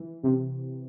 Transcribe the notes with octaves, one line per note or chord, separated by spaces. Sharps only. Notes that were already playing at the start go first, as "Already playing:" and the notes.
Already playing: E3
C3